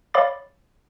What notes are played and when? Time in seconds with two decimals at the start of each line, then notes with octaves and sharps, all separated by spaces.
0.14 C#5 F5 B5 D6 A6